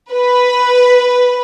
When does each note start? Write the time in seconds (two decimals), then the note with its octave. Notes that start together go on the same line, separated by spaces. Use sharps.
0.12 B4